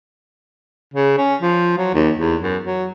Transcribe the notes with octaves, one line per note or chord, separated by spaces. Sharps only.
C#3
C#4
F3
F#3
D#2
E2
F#2
F#3